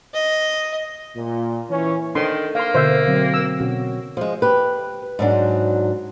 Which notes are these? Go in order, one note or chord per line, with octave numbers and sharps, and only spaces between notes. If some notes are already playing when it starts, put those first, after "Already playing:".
D#5
A#2
E3 C#4
D#3 D4 A4 C5 C6
A#3 F5 C6
B2 D3 C5 E5
D3 F#3 C4
E6
B2 C#4 F#4
F3 G#3
G4 B4
G#2 F#3 D4